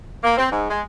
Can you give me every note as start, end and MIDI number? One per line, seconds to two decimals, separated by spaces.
0.24 0.36 58
0.37 0.47 60
0.52 0.67 44
0.70 0.82 56